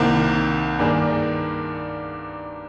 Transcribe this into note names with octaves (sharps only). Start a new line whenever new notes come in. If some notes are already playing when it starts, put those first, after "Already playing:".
Already playing: C2 C3 D#3 A#3
G2 D#3 A#3 D4 G#4